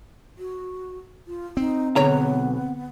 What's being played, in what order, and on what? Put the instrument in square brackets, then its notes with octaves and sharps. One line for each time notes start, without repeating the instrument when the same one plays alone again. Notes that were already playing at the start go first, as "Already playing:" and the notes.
[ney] F#4
F4
[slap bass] C4 [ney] D#4
[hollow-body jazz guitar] B1 C#5 A#5 [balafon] D3 [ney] B3